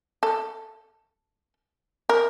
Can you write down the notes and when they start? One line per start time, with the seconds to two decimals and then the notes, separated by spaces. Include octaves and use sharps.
0.23 A4
2.09 A#4